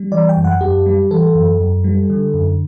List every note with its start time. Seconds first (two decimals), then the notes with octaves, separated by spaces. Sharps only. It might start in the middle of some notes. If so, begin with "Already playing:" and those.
Already playing: G3
0.12 E3 D5
0.29 G5
0.37 F#2
0.44 F#5
0.61 F#2 G4
0.86 G3
1.11 E3 A4
1.35 F#2
1.60 F#2
1.84 G3
2.10 D3
2.34 F#2